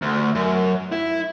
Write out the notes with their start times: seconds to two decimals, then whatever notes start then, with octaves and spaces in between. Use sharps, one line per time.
0.02 D2
0.35 F#2
0.92 E4